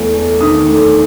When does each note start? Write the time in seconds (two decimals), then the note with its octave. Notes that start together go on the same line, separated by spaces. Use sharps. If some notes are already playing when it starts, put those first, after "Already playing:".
Already playing: E2 A3
0.14 A3
0.40 D#3 D#6
0.67 A3